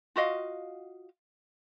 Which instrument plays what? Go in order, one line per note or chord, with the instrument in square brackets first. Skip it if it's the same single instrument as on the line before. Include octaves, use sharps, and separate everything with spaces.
[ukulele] F4 F#4 D#5 F5